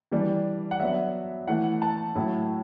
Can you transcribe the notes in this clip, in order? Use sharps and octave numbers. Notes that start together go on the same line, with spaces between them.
E3 G3 D4
F#5
F#3 B3 D4 E5
E3 A3 E4 F#5
A5
A2 F#3 A3 E4